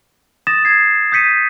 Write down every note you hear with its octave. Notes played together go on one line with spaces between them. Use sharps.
D#6 A6 A#6 E7
G#6 C7
D#6 G6 B6 C#7 D#7